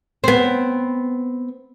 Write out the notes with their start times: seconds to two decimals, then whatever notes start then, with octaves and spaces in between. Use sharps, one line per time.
0.24 B3 C4